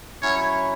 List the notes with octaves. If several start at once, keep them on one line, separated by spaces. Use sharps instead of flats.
F#3 C#4 E4 C#5